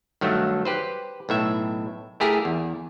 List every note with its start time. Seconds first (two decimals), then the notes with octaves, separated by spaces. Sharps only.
0.21 G2 D#3 F#3 A3
0.65 G4 B4 C5
1.29 B1 A2 E5
2.20 A3 E4 G4 G#4 A#4
2.45 E2